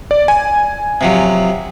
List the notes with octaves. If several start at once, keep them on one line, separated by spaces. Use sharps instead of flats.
D5
G#5
C3 F3 F#3